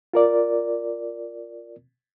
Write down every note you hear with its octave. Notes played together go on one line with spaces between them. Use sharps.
F4 A#4 D5